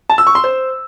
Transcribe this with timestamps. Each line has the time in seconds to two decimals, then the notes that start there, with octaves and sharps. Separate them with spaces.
0.10 A5
0.18 E6
0.27 C#6
0.35 C6
0.44 C5